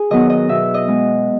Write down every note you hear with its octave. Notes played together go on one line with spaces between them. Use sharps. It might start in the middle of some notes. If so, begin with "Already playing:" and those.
Already playing: G#4
D#3 F#3 B3 D#5
D#5
B2 E5
D#5
G#3 B3